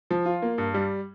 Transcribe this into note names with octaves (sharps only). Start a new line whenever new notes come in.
F3
F4
A#3
G2
G3